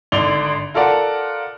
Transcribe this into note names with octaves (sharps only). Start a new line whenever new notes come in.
G#1 D3 D5 F7 G7
F4 A4 A#4 D5 F#5